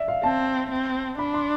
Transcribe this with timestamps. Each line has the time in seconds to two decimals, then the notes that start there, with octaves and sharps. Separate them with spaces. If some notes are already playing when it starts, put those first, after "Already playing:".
Already playing: D5 E5
0.08 F5
0.23 C4 A5
0.71 C4
1.19 D4 B5
1.34 C6